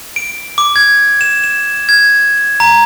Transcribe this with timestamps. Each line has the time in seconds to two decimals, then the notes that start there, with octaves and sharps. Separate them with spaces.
0.16 D7
0.58 D6
0.76 G#6
1.21 E7
1.44 E7
1.89 G#6
2.60 A#5